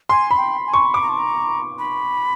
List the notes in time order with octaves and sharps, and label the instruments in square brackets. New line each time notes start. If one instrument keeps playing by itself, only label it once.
[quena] G#5 [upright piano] C6
[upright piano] B5
[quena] G5
G#5
[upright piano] C#6
[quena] B5 [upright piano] D6
[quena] A#5
A5
A#5
B5